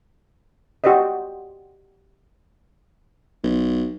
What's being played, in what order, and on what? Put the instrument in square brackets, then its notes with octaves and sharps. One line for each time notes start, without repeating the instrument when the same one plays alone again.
[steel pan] F#4 G4 C5 D5 D#5
[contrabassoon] B1